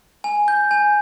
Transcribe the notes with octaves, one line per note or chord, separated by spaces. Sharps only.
G#5
G6
G#5